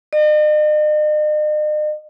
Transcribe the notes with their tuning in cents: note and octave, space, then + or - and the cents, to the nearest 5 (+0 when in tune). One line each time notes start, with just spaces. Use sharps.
D#5 -45